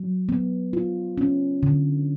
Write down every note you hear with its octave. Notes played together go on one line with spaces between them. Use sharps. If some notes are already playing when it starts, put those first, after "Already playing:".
Already playing: F#3
B3
F4
C#4
D3